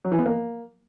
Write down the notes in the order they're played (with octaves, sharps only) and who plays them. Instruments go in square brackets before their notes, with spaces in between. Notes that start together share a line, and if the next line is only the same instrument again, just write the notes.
[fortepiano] F#3
E3
B3
A#3